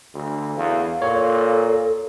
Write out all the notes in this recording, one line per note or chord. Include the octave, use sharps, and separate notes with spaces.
D2
E2 F5
A#2 A4 C#5